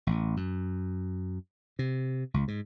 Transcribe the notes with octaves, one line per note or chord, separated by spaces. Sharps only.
A1
F#2
C3
C#2
G#2